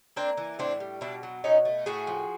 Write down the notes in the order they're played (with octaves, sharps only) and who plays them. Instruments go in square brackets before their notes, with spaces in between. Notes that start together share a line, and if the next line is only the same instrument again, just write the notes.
[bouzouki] A#3 C4 D4
E3
A2 C4 D4
G3
B2 D4 E4
F#3
B2 C#4 D#4
A3
A2 F#4 G#4
F3